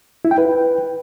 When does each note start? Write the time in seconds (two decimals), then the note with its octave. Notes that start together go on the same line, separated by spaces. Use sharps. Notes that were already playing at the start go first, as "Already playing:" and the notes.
0.25 E4
0.31 G5
0.38 B4